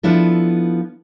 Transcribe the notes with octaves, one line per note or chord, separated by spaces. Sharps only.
F3 B3 D4 E4 A4